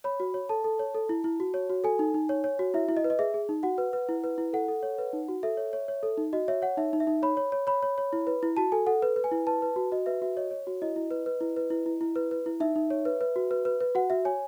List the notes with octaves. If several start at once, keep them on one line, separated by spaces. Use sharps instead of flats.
C#5 B5
F#4
C#5
A4 A5
A4
C#5
A4
E4
E4
F#4
C#5
F#4
A4 G#5
D#4
D#4
C#5
C#5
F#4
E4 E5
E4
D#5
B4
D#5
G#4 E5
G#4
D#4
F#4 F#5
B4
B4
E4
B4
E4
A4 F#5
A4
C#5
B4
D#4
F#4
A4 E5
C#5
C#5
C#5
A4
D#4
F#4 D#5
C#5 E5
C#5 F#5
D#4 E5
D#4
E5
D#4
C#5 B5
C#5
C#5
C#5 B5
C#5
C#5
E4
B4
E4
F#4 A5
A4 G#5
A4 F#5
B4
B4
G#5
E4
B4 A5
B4
F#4
F#4 D#5
B4 E5
F#4 E5
C#5 D#5
C#5
F#4
E4 D#5
E4
B4
B4
E4
B4
E4
E4
E4
B4
B4
E4
D#4 E5
D#4
C#5
B4
B4
F#4
B4
B4
B4
F#4 F#5
F#4 E5
C#5 G#5